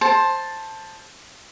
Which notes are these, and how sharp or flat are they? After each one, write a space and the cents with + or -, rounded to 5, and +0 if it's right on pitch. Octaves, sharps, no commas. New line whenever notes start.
C5 +15 A5 +0